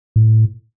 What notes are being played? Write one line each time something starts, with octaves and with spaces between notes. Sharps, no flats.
A2